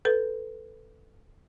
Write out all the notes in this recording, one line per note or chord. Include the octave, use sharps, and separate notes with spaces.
A4 B4